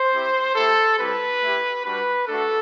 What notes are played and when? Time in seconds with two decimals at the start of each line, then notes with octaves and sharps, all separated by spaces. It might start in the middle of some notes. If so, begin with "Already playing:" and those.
Already playing: C5
0.13 C4 E4 G4
0.55 A3 E4 G4 A4
0.99 G3 C4 E4 G4 B4
1.41 A3 E4 G4
1.84 G3 D4 F#4 B4
2.28 A3 D4 F#4 A4